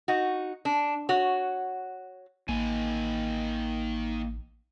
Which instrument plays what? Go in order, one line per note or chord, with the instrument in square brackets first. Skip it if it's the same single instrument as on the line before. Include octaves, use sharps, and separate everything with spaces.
[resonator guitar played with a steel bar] D#4 F#4
D4
F#4 C#5
[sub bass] A1 [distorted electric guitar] D#3 G#5 [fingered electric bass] A#3